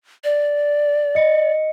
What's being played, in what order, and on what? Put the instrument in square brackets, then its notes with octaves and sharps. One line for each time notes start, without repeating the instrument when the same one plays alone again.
[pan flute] D5
[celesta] D#5 C#7